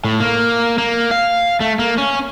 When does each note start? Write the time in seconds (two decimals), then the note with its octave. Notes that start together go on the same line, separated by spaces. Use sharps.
0.04 A2
0.20 A#3
0.78 A#3
1.11 F5
1.60 A3
1.79 A#3
1.98 C#4